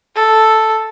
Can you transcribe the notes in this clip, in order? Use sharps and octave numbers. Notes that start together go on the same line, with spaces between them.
A4